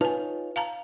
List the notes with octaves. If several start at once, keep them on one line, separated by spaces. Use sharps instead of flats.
D#4 F4 B4 C#5 G#5 A5
F5 A5 A#5